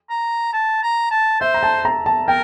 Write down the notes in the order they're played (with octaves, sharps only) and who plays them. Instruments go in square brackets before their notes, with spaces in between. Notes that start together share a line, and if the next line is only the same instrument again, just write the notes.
[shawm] A#5
A5
A#5
A5
[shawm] C5 [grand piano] E5
[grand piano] A#5
A5
A#5
A5
[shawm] A#4 [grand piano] G5